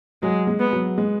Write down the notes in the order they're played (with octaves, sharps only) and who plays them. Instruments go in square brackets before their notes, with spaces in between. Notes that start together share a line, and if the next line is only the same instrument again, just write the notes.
[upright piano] F#3 [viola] G#3
[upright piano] G#3
[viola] B3
[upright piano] F#3
G#3